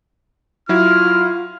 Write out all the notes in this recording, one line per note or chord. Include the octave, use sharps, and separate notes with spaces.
F#3 E4 F4 F6